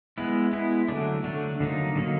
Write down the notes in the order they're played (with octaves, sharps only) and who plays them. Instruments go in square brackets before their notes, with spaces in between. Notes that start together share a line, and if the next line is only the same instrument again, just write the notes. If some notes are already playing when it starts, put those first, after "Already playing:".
[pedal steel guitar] G#3 B3 E4
G#3 B3 E4
D3 F#3 A3 D4
D3 F#3 A3 D4
D3 F#3 A#3 D#4
D3 F#3 A#3 D#4